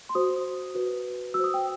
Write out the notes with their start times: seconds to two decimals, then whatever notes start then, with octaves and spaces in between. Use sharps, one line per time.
0.09 C6
0.15 F#4 C5 D#6
0.75 F#4 B4
1.34 F#4 C5 E6
1.44 D#6
1.54 G5